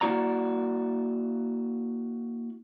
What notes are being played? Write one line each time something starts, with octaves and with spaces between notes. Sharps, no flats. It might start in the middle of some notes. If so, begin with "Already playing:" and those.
A#3 E4 F#4 D5 A#5